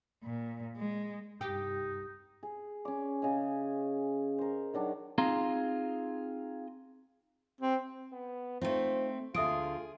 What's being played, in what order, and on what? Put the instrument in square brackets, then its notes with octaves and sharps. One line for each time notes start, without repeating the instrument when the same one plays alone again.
[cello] A#2
G#3
[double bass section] C2 G2 [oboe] D#4 [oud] G4
[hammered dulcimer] G#4
C#4 D6
C#3 D#5 G#5
A#4 C5
D#3 F#3 D4
[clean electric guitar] C4 D#4 F4 G#4 A#5
[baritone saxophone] C4
[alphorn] B3
[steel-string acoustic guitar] A3 C4 [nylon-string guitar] D#4 F4 [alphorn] C5
[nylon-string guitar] D2 D3 G#3 [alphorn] F4 [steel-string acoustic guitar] G#4 [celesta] E5 D#6 D7